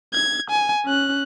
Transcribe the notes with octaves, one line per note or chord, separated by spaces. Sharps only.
G#6
G#5
C#4 F#6